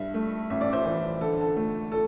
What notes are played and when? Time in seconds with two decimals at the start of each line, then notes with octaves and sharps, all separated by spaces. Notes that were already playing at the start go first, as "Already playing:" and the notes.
Already playing: G2 E5
0.14 A3
0.50 A1 E5
0.61 D5
0.73 C5 E5
0.85 E3
1.21 D3 A4
1.41 A4
1.57 A3
1.92 A4